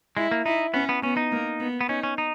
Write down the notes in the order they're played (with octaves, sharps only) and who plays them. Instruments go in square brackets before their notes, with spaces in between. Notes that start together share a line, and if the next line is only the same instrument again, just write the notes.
[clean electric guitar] G#3 [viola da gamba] E4
[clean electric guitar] A#3
[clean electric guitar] D#4 [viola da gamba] E4
[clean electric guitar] B3 [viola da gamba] C#4
[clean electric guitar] B3
[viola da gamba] B3 [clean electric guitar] C#4
[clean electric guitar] D#4
[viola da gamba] A#3
B3
[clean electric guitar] B3
[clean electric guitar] C#4 [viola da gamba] D#4
[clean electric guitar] C#4
D#4